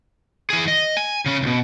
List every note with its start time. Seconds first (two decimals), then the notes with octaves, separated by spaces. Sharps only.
0.50 E3 G#4
0.68 D#5
0.97 G#5
1.26 C#3 C#4
1.43 C#2 B2